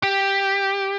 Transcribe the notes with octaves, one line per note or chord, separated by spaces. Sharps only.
G4